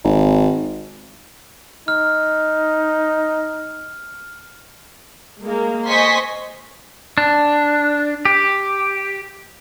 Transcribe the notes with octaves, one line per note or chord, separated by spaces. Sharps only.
G#1
D#4 F6
G#3 A#3
C5 D#5 G#5 C6 C#6 B6
D4
G4